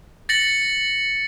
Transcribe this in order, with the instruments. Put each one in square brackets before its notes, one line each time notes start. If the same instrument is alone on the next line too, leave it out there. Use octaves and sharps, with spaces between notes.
[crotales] A6 A#6 C#7 F#7